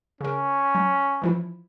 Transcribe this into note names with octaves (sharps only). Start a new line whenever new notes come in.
C#3 C#4 A#4
F#3
E3 F3 E4